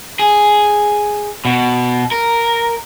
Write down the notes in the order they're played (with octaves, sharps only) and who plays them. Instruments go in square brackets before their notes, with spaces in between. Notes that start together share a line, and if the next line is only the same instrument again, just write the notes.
[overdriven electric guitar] G#4
B2
A#4